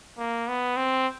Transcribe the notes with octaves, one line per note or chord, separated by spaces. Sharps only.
A#3
B3
C4